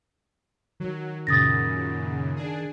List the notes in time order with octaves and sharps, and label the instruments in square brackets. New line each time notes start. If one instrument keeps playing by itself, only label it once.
[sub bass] D#3 [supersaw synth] F#3
[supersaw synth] F#2 A#2 C#3 [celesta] D#6 A6 A#6
[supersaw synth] D4 G#4